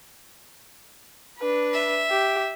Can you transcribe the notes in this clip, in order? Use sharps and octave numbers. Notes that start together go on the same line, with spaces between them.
D4 B4
E5
G4